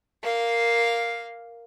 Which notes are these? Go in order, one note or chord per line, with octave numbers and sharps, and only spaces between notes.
A#3 F5